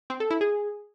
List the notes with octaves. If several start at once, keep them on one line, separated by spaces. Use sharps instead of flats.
C4
A4
E4
G#4